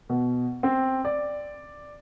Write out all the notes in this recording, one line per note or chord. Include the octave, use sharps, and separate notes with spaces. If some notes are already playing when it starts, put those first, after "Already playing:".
B2
C4
D5